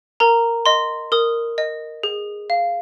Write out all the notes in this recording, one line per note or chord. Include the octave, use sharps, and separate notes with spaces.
A#4 A#5
D#5 C6
A#4 D#6
D#5
G#4
F5